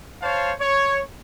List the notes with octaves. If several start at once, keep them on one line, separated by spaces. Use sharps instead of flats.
C5 C#5 F5 A5
C#5